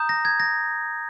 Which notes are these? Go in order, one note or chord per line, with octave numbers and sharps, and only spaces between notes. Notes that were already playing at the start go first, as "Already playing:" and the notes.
Already playing: A#5 D#6 G6
A#6
G#6
A#6